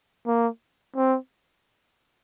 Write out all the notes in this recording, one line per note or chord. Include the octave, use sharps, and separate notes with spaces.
A#3
C4